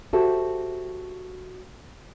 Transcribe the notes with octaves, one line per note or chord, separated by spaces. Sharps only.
F#4 G4 A4 C5 E5